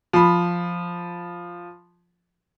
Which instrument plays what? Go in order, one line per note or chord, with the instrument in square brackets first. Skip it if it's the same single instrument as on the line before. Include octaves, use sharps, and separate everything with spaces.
[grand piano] F3 B5